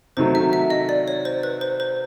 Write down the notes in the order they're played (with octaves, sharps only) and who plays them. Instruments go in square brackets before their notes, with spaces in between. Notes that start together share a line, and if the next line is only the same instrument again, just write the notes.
[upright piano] C3 D#3 F#3 A3 [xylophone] C5
[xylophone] E5
E5
D#5
D5
C#5
C5
B4
C5
C5